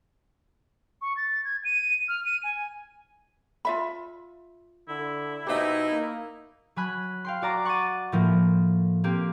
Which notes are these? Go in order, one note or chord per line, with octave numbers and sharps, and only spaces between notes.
C#6
A6
G#6
D#7
F6
D#7
G#5
F4 E5 B5
D3 E4
B2 D#4 G4 C5 E5
A#3
F#3 G#5 B5 F#6
F5 G5 C6
F#4 D5 A#5 D6
F#5 C#6 D6 A6 D#7
A2 F3 A#3
A#3 C4 G4